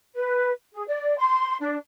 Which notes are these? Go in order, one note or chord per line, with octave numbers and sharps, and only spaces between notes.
B4
G#4
D5
C6
D4